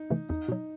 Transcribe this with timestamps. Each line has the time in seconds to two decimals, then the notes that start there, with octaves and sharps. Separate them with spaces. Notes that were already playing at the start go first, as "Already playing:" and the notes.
Already playing: D#4
0.10 C3 E3 A3
0.29 E2 D#4
0.48 B2 F#3